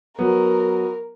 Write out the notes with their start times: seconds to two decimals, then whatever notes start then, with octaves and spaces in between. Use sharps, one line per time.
0.19 F#3 B3 A#4